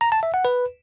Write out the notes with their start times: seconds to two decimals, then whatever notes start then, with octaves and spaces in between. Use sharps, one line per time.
0.01 A#5
0.12 A5
0.23 E5
0.34 F#5
0.45 B4